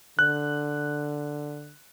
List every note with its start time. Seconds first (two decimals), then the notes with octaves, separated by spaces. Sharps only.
0.19 D3 F#6